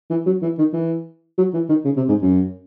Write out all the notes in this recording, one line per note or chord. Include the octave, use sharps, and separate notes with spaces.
E3
F#3
E3
D#3
E3
F#3
E3
D#3
C#3
C3
G#2
F#2